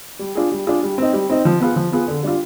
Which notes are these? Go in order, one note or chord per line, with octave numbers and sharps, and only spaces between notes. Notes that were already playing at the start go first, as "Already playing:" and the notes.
G3
D4 F4 G#4
G3
D4 F4 G#4
G3
C4 D#4
G3
C4 D#4
F3
B3 F4 G#4
F3
B3 F4 G#4
D3
G3 D4 F4